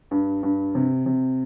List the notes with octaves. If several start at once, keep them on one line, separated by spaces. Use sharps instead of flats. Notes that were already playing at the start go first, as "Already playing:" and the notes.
G2
G2
C3
C3